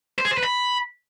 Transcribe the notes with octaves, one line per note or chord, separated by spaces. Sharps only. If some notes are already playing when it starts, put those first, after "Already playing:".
C5
G#4
C5
B4
B5